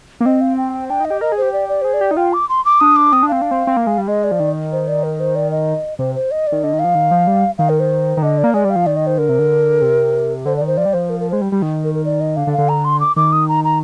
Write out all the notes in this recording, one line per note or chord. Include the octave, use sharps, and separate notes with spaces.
A#3
C4 D#5
F5
G5
G5
D4 G5
D#4 D#5
G4
A#4 D#5
G#4
G4 C5
D5
D5
G#4 C5
D5
G4
D#4
F4 G5
D6
C6
D6
D4 D#6
D6
C4 D#6
D4
C4 F5
D4
C4
C4
A#3
G#3
G3
G#3 D#5
D5
F3
D#3
C5
D5
A#4
C5
D5
D#5
C3 C5
C5
D#5
D5
D#3
D3 D#5
D#3
F5
F3
D#3
F3
G3
D#3 F5
A#4
C5
D#3
D3 D#5
D5
A#3
G#3 D5
G3
F5
F3
D#3 D5
D#5
C5
D3 A#4
C3
D3
C3
D3 C5
D5
D#3
C5
F3 D5
G3
F3 C5
A#4
A#4
G#3 C5
G3
G3
D#3
A#4
A#4
D5
D#5
D3 F5
D3
F5
D3
A#5
C6
D6
D#3 D6
D#6
A#5
A#5